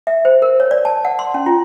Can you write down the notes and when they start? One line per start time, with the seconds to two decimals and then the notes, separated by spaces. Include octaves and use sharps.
0.07 E5
0.25 C5
0.42 A#4
0.60 C#5
0.71 D5
0.85 A5
1.05 F#5
1.19 C6
1.34 C#4
1.46 F4